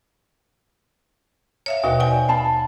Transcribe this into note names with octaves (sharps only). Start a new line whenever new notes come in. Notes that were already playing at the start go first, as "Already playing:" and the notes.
C#5 E5 F5
D#2 B2 F#4 D#5 F#5
C5 D5 G5 G#5
F5 A5 B5